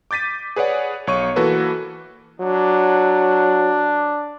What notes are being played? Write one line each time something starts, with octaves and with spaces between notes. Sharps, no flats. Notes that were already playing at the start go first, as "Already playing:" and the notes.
D6 G6 A6 B6 D#7
G#4 B4 C#5 D5 F#5
B1 C#5 C#6 D#7
E3 A#3 F#4 A4 B4
F#3 D4